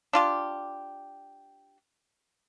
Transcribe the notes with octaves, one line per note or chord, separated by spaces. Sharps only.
D4 F4 G4